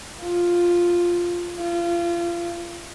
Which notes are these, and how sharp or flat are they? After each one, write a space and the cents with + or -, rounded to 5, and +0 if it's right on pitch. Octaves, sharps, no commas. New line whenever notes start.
F4 +0
F4 -30